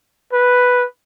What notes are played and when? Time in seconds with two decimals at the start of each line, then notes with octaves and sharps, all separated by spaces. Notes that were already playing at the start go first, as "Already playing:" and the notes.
0.33 B4